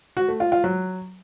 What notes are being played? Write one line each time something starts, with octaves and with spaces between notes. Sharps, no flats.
F#4
A3
F4
F4
F#3